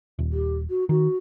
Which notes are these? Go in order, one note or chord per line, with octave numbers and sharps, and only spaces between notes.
D#1
G4
F#4
D#3 F#4